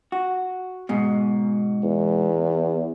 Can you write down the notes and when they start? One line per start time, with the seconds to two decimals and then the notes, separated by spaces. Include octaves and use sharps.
0.12 F#4
0.89 G#2 B2
1.83 E2